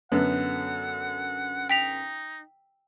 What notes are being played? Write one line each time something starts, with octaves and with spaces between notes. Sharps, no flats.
F#2 D3 B3 F#5
D#4 G5 B6 F7